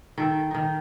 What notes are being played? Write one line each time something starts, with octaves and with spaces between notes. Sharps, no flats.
D#3 A4
D#3 D#4